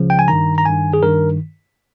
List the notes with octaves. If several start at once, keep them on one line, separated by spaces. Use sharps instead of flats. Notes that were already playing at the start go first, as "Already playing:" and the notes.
Already playing: C#2 C#3 F3
G5
G#5
G2 D#3 A#5
A#5
G2 D#3 G#5
G#4
G2 D#3 A#4